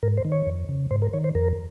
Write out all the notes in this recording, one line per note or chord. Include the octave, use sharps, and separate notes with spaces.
G#2 A#4
C5
D#3
C#5
F2
C#3
G#2 C5
A#4
D#3 C#5
C5
F2 A#4